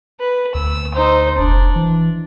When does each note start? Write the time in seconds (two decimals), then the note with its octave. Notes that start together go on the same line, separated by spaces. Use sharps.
0.21 B4
0.54 D2 E6
0.94 D#4 C5
1.38 F1 D4
1.75 E3